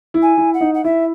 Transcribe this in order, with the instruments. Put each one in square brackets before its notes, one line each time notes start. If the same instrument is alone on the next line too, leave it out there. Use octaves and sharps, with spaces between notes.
[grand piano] E4
[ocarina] G#5
[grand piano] E4
[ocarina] F#5
[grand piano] D#4
[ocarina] F#5
[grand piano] E4 [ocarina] E5